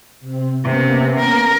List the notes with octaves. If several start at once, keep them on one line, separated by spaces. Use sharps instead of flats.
C3 C4
C3 A#3 B3 C#4
A#4